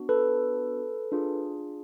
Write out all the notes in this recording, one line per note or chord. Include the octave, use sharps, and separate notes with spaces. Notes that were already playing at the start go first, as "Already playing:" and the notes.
Already playing: B3 D4 F#4
A4 B4
D4 F4 G#4